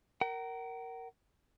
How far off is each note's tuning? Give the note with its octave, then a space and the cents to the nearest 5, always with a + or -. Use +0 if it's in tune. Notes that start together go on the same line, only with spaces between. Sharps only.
A#4 +0 F#5 +45